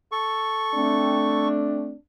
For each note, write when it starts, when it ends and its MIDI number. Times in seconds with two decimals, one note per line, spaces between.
0.12 1.48 69
0.12 1.48 85
0.74 1.92 57
0.74 1.92 60
0.74 1.97 62